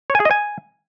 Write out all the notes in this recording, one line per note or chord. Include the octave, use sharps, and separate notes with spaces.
C#5
G#5
G#4
D#5
G#5